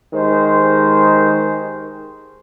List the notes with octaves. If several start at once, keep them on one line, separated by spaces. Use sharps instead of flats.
D#3 G#3 G4 C5